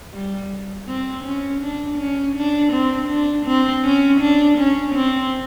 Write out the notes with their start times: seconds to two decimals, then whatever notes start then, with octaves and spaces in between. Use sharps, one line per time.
0.13 G3
0.88 C4
1.24 C#4
1.62 D4
1.98 C#4
2.36 D4
2.73 C4
3.09 D4
3.46 C4
3.84 C#4
4.21 D4
4.58 C#4
4.95 C4